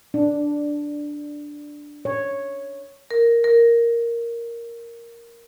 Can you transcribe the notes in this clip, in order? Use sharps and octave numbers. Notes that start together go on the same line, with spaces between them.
D4
C#5
A#4
A#4